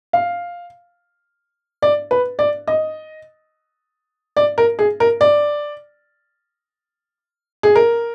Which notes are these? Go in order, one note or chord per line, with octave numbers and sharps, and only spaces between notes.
F5
D5
B4
D5
D#5
D5
A#4
G#4
A#4
D5
G#4
A#4